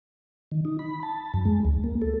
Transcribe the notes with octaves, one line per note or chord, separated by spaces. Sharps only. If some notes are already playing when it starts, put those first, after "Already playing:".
D#3
D#4
B5
A5
F#2
G#3
D2
A#3
A4